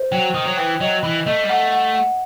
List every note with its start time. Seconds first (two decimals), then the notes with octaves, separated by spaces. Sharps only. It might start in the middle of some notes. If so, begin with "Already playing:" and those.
Already playing: C5
0.12 F#3 G5
0.34 D#3 D#6
0.46 F#3
0.57 E3 G5
0.81 F#3 D#5
1.03 E3 B5
1.26 A3 D#5
1.44 G3
1.49 A3 F#5
1.72 F#5
1.95 F#5